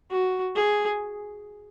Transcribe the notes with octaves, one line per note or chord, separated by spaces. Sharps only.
F#4
G#4